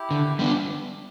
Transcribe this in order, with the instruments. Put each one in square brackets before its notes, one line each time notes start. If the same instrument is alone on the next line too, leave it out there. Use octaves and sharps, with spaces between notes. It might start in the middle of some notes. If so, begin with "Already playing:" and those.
Already playing: [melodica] E4 G4
[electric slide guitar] D3
G3 B3 D4